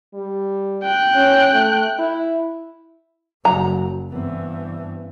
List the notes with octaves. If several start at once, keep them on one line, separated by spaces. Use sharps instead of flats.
G3
G5 F#6
C#4
A3
E4
F#1 F#3 A#5
G2 E3 B3 C4